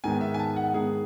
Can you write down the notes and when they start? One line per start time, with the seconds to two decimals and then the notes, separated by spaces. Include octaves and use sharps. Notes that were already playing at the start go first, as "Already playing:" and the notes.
0.04 G#2 D#3 G#3 B3 G#5
0.21 E5
0.34 G#5
0.39 A5
0.56 F#5
0.74 G#2 D#3 G#3 B3 G#4